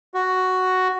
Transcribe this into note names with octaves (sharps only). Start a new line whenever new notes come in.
F#4